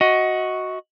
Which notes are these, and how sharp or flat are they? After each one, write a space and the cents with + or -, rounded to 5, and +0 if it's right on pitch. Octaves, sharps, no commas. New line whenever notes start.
F#4 +0 D#5 +20